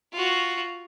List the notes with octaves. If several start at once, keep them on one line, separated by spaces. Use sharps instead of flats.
F4 F#4